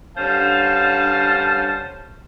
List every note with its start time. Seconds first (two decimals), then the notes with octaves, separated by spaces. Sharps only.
0.18 G2 D3 C#4 C5 F5 A5